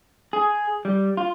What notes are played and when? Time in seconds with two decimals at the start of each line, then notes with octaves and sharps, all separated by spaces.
0.33 G#4
0.85 G3
1.17 F4